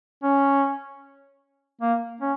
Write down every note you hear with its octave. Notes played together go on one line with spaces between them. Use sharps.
C#4
A#3
C#4